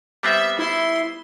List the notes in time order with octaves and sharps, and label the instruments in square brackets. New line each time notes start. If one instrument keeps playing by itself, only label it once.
[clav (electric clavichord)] G3 B3 C4 [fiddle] E5
[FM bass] E4 [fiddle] C6